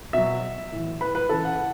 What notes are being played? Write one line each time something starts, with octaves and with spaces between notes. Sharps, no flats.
B2 F#3 E5
A2 E3
B4 B5
B4 B5
C#3 E3 A4 A5
F#5